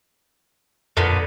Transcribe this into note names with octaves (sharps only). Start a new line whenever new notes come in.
F2 A#2 D3 B3